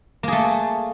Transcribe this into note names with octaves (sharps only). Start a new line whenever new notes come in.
A3 A#3 G#4